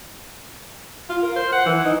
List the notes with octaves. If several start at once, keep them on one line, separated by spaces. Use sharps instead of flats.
F4
A#4
C5
F#5
E3
D#4